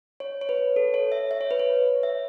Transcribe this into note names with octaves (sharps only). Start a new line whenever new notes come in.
C#5
C#5
B4
A4
C#5
E5
E5
C#5
B4
C#5
E5